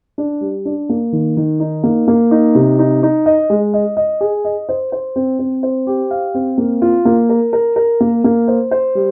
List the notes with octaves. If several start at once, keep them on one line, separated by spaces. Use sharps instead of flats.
D4
G3
D4
A#3
D#3
D#3
D#4
A#3
A#3
D#4
C3
D#4
D#4
D#5
G#3
D#5
D#5
G#4
D#5
C5
C5
C4
C4
C5
G4
F5
C4
A#3
F4
A#3
A#4
A#4
A#4
A#3
A#3
C5
C5
G3